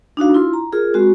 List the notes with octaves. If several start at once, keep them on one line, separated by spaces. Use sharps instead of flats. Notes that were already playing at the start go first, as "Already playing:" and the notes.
D4 D#4 F#4 F5
E4 F4 C6
A#5
F4 G#4 A#4
G#3 C4 F#4